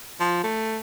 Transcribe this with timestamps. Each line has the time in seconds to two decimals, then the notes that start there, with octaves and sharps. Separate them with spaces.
0.20 F3
0.44 A3